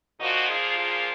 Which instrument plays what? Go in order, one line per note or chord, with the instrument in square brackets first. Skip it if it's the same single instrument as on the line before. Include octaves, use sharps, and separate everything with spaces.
[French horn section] A#2 F3 A#3 D#4 F#4
F4 G#4
F4 G#4